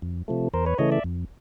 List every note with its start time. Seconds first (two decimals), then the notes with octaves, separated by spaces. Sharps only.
0.02 F2
0.28 C3 F3 A3
0.54 E2 A#4 C5
0.66 B4 C#5
0.78 C#3 E3 A3 C#5 D#5
0.92 D5 E5
1.04 F2